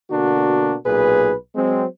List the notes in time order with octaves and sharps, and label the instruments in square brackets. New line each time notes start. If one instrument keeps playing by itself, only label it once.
[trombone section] B2 D3 A#3 D4 F#4
B1 A#2 G#4 B4
F#3 G#3 C4